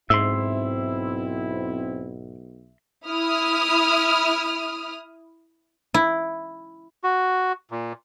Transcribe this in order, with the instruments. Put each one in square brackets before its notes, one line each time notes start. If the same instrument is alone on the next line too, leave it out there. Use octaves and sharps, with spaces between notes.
[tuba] B1 [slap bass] G#2 [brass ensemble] C4 E4 [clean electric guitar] E5 C6
[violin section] E4 D#6 F6
[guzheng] E4
[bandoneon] F#4
A#2